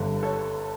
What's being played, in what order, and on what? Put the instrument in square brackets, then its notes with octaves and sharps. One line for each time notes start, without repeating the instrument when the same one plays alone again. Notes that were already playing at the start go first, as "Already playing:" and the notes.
Already playing: [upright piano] G1 G2 D3
A4 C#5